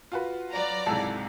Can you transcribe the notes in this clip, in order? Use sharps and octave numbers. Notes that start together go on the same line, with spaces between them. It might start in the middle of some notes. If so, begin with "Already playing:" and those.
F4 F#4 B4
F#3 D5 A#5
C#2 G#2 C3 E4 A4 A5